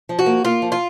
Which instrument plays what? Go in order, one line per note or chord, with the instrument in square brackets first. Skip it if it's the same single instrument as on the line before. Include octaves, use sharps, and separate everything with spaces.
[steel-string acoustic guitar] F3
[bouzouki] F#4
[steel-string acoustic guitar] A#3
[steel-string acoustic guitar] A#3 [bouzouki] F4
[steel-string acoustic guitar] F3
[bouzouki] F4